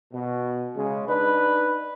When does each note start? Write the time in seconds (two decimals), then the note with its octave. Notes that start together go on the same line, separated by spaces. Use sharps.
0.14 B2
0.76 C#3 G#3
1.08 D4 D#4 B4